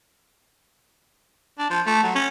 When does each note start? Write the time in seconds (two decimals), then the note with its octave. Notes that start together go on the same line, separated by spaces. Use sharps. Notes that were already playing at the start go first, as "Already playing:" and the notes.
1.58 D4
1.70 F3
1.87 A3
2.03 F#3
2.15 C#4